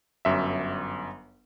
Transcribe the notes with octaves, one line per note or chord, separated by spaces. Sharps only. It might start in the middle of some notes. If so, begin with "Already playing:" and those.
G1 F#2 E5